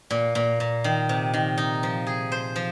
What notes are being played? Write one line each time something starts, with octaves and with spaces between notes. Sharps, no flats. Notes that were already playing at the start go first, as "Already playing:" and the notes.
A#2
A#2
A#2
D#3
C3
D#3
D#4
F3
G#4
C5
F3